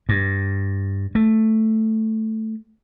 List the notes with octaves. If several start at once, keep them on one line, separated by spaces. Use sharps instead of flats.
G2
A3